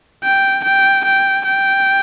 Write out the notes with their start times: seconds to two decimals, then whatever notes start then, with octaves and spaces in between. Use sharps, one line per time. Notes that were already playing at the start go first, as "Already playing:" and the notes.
0.24 G5
0.64 G5
1.05 G5
1.45 G5